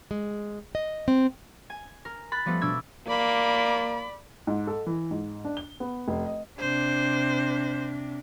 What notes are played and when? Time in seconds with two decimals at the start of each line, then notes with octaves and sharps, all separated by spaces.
0.11 G#3
0.75 D#5
1.08 C4
1.70 G#5
2.05 A#4
2.32 B5 F#6 A6
2.46 F3 G3 A3 B3 B4
2.61 B2 D4 D6 E6 G#6
3.07 A#3 D5 B5
4.47 G#2
4.67 A4
4.86 E3
5.11 G#2
5.45 D4
5.57 G7
5.80 B3
6.08 F1
6.26 D#5
6.59 C3 D4 C5